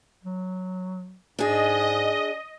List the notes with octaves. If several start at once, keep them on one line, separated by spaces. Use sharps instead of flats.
F#3
G#2 D4 G#4 D#5